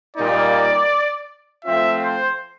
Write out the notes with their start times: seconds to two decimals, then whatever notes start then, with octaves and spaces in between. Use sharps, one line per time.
0.16 A#2 G3 A#3 D#4 D5
1.65 F3 A3 C4 F4 E5
2.02 C5